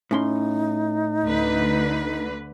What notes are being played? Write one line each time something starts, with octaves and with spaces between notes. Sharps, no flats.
A2 C#4 D#4 C6
D2 D3 B4